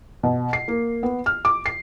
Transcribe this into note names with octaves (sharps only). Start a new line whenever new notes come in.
B2
C7
A#3
B3
F6
D6
C7